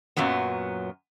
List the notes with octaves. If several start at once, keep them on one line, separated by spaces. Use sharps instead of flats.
F#2 A#2 F#3 B3